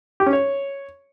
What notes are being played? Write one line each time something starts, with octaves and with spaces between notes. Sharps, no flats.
G4
C#4
C#5